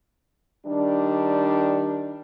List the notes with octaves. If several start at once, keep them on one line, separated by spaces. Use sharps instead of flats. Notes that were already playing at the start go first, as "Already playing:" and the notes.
D#3 G3 D4